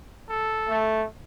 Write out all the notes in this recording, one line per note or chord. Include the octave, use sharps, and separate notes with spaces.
A4
A3